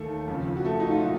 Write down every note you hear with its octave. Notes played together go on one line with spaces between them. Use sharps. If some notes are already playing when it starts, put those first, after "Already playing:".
Already playing: D#2 D#3 A3 A4
F2 C#3 F3
F#4
A3 A4
D#4
F4
A#2 F#3 F#4